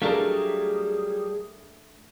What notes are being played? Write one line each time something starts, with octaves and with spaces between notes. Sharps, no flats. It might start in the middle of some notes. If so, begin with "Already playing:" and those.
F#3 G3 A3 D4 G#4 A#4 D5 F5